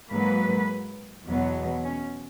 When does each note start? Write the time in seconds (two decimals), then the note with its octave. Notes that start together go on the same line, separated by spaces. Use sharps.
0.11 G#2 F#3 A#3 B4
1.28 E2 B2 F#3 B3
1.85 C#4